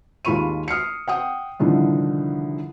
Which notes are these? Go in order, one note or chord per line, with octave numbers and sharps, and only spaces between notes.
D#2 G#3 F4 B5 C#6 D#7
D#6 F6 C7 C#7
F#5 G5 D#6
C2 A2 D3 D#3 F3